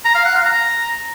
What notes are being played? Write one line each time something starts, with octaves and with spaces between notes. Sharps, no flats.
A#5
F5
F#5
F5
A#5